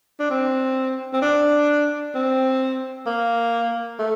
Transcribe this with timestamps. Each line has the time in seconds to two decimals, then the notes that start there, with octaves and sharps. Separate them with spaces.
0.19 D4
0.30 C4
1.13 C4
1.22 D4
2.15 C4
3.07 A#3
3.99 A3